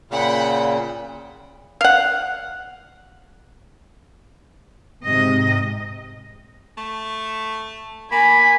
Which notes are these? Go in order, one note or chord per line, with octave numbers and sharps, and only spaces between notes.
A#2 C#3 F#5 G5 B5
F5 F#5
G#2 C3 D#5
A3
A#3 G#5 B5